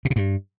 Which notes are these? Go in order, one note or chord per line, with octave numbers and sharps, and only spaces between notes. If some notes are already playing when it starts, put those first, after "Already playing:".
B2
C3
G2